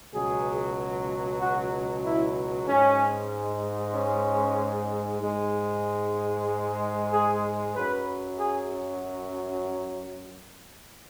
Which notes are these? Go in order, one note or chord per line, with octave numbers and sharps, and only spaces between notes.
C#2 B2 F#3 G#4
F#4
E4
G#2 G#3 C#4
C#4
G#2 G#3
G#4
F#2 F#3 B4
G#4